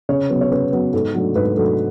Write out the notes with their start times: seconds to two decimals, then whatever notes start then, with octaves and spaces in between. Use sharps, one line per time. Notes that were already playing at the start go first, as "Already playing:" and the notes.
0.09 C#3 C#5
0.30 F#3 B3
0.41 C#5
0.51 C#3 B4
0.72 F#3 B3
0.93 G#2 A4
1.14 F#3 A3 D4
1.35 G#2 B4
1.56 F#3 A3 D4 A4